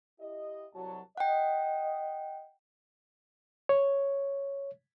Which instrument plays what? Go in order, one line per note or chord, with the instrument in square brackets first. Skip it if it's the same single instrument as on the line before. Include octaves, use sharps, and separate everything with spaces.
[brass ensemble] E4 G4 D#5
C2 F#3 A5
[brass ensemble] D#5 [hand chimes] F#5 G5
[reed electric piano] C#5